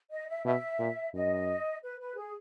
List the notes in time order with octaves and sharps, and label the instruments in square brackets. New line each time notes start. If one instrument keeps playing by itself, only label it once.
[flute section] D#5
E5
[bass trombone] B2 [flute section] E5
[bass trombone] A#2
[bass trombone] F#2 [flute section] D#5
[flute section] B4
B4
G#4